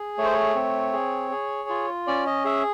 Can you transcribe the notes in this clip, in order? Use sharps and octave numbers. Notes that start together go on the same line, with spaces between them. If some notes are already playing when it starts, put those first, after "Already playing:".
Already playing: G#4
A3 C#5
C5
C#5
C4
G#4
G#4
F4
C#4 D5
D#5
G#4 E5